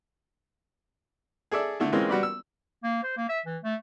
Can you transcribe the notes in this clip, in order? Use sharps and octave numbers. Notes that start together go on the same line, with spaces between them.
G#4 A4 D5 E5
D3 A3 E4
E3 G#3 A#3 C4 C#4 F4
G3 F#4 B4 D5
E6
A#3
C5
A#3
E5
E3
A3